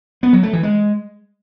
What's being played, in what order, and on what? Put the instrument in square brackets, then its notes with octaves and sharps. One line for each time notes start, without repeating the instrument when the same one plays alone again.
[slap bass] B3
F#3
A3
E3
G#3